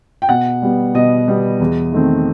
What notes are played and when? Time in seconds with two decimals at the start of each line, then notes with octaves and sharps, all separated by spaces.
0.22 G5
0.28 B2 F#5
0.62 G3 B3
0.94 B2 D#5
1.28 G3 B3
1.60 E2
1.92 D#3 A3 C4